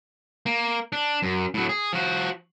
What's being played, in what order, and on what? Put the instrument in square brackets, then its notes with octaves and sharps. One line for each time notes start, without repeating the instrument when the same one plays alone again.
[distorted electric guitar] A#3
D4
F#2
A2 F#3
G#4
F3 F#4